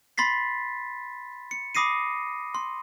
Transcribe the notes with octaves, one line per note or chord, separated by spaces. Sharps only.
B5 C6 A6 B6 C7
C#7
B5 D6 D#6 A#6 C7 D#7
C6